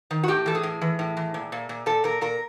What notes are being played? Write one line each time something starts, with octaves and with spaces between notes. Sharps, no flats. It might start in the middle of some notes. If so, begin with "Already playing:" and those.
D#3
F#4
A2 G4
E3 A4
G#4
A2
E3
A2
E3
A#2
A#2
A#2
A#2 A4
A#2 A#4
A#2 A#4